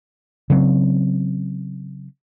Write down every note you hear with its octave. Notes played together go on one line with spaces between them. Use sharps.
C#3 F#3 C4